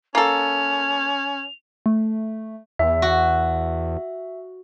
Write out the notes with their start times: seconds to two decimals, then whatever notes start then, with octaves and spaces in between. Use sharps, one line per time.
0.15 A#3 C#4 A4 F7
1.86 A3
2.79 E2 E5
3.02 F#4